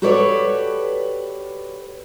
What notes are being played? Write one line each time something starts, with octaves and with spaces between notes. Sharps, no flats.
F#4 G4 A4 B4 C#5 D5